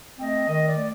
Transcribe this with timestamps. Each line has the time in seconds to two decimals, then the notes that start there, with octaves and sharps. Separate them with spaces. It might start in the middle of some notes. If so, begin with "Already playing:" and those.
0.19 A3 C4 D#5
0.48 D#3 D#5
0.67 D5
0.76 A3